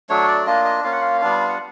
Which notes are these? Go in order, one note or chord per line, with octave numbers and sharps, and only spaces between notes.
F#3 A3 D4 C#5
D5
A#3 D4 F4 D#5
D#5
A#3 C#4 F4 F5
F#5
F5
G3 B3 D4 F4
F#5